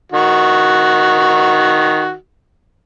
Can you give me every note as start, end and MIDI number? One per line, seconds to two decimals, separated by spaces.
0.12 2.14 51
0.12 2.14 66